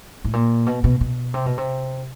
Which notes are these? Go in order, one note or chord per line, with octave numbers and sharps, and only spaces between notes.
A2
A#2
B2
B2
B2
C3
B2
C3